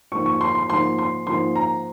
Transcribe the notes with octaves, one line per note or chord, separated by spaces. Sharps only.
G#2 F3 A#3 C#6
C#6
C6
C6
G#2 F3 A#3 C6
C6
G#2 F3 A#3 C6
A#5